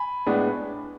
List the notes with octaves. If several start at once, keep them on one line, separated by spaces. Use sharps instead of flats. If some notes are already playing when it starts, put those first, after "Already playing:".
Already playing: G#5 B5
A2 G#3 B3 D4